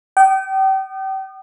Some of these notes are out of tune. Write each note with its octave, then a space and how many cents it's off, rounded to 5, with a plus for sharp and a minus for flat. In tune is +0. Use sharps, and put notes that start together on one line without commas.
G5 -35 D#6 -35